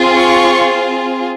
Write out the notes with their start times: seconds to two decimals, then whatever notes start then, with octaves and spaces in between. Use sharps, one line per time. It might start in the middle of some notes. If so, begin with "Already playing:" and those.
Already playing: C4 F4 G#4
0.18 C#6